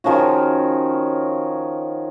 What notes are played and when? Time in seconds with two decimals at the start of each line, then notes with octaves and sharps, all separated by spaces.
0.04 D#3 F3 C#4 F#4